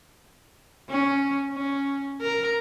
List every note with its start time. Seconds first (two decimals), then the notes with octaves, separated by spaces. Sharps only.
0.90 C#4
1.53 C#4
2.21 A#4